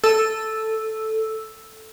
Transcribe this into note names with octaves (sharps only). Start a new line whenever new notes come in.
A4 E6